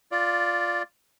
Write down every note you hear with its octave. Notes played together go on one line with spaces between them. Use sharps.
F4 D5